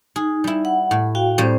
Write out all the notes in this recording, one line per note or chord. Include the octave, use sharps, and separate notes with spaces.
D#4 G#4
G3 E4
F#5
A2
F#4 F5 G5
A2 G3 C4 C5